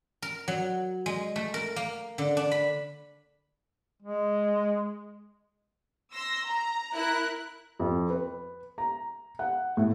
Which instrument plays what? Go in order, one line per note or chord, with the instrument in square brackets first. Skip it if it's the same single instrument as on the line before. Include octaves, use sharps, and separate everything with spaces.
[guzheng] A#4
F#3
G#3
A3
A#4
A#3
D3
D4
B5
[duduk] G#3
[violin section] C6 E6 A#6
A#5
E4 A#4 F#6
[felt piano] F2
B4
A#5
F#5
A2